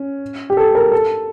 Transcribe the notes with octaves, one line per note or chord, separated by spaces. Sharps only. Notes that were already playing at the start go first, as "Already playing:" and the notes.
Already playing: C#4
G4
A4
A#4
A4